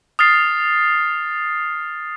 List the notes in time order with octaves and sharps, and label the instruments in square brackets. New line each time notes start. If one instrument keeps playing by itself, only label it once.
[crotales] D#6 F6 A6 C7